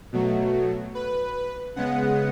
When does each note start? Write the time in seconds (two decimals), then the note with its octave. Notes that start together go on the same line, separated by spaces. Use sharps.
0.13 B2 F#3 A3
0.95 B4
1.76 C#3 G#3 B3 F#5